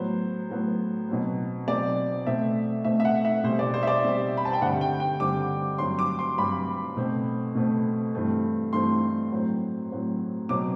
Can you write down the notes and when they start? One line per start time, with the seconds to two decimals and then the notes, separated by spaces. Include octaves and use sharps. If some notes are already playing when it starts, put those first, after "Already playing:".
Already playing: A2 F#3 B3 C5
0.50 A2 F#3 B3
1.09 B2 F#3 C4
1.68 B2 F#3 C4 D5
2.27 B2 A3 C4 E5
2.85 B2 A3 C4 E5
3.00 E5
3.05 F#5
3.25 E5
3.44 B2 G3 C4 C5
3.59 D5
3.74 C5
3.83 E5
3.87 D5
4.02 B2 G3 C4
4.37 B5
4.45 A5
4.53 G5
4.61 G2 D3 G3 C4 F#5
4.81 G5
5.00 G5
5.20 G2 D3 G3 C4 D6
5.78 G2 F#3 C4 C6
5.99 D6
6.19 C6
6.38 G2 F#3 C4 B5
6.96 B2 A3 C4
7.55 B2 A3 C4
8.14 G2 E3 A3 C4
8.73 G2 E3 A3 C4 C6
9.32 A2 F#3 C4
9.90 A2 F#3 C4
10.49 B2 F#3 C4 D6